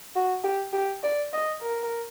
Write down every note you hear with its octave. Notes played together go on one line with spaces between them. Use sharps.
F#4
G4
G4
D5
D#5
A#4